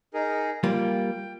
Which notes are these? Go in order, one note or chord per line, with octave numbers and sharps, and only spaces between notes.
D#4 G#4 A#4
G3 A#3 F4 G5